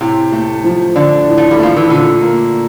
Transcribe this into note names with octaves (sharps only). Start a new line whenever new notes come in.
A2 C3
A3
F3
D3 D4
A2
A3
G3
F3 A3
E3
A#2 D3
A#3